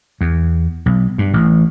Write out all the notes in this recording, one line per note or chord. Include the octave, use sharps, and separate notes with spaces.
E2
B1
G2
A1